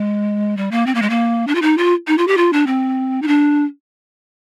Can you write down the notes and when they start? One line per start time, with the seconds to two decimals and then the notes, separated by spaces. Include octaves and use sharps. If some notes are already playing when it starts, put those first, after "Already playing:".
Already playing: G#3
0.57 G3
0.71 A#3
0.86 C4
0.95 A#3
1.02 G#3
1.10 A#3
1.47 D4
1.55 F4
1.62 D#4
1.78 F4
2.07 D#4
2.18 F4
2.27 G4
2.37 F4
2.53 D4
2.67 C4
3.22 D#4
3.28 D4